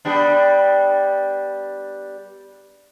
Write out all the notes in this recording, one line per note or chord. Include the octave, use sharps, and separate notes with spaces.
G3 B3 D4